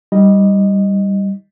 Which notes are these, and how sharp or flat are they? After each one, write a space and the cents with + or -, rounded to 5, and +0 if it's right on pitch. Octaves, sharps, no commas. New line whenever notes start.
G3 +0 D#4 +15 D#5 +0